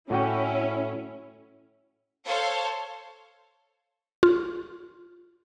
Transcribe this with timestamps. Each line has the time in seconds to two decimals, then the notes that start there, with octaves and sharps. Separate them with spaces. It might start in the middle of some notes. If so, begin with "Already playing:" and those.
0.10 A2 C#4 E4 F#4 G5
2.27 A4 C5 C#5 F5
4.23 F4